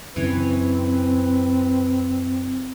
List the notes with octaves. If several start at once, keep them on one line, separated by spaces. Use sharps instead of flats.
F#2 C#3 E3 C4 B4 C#5